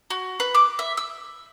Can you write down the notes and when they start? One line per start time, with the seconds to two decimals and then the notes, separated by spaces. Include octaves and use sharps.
0.10 F#4
0.40 B4
0.55 D6
0.79 E5
0.97 E6